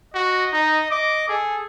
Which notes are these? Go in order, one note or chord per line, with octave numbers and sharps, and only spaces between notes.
F#4 D#5
D#4
D#5 D6
G#4 A4